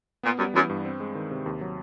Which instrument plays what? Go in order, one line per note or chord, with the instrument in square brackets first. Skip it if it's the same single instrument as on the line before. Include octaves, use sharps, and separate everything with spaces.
[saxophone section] A#2 [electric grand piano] B3
[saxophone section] F#2 [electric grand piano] G3
[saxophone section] F#2 [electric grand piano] E3
[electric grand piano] G2
C4
G#3
D#3
C3
D#2
F#3